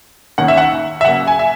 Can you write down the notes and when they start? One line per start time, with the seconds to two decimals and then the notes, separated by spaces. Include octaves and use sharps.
0.38 D#3 A#3 C#4 F#5
0.48 E5
0.57 F#5
1.01 E5
1.05 C#3 F#3 A#3 F#5
1.27 G#5
1.39 E5